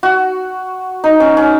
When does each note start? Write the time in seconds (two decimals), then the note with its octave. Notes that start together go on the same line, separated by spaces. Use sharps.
0.03 F#4
1.04 D#4
1.20 C#4
1.37 C#4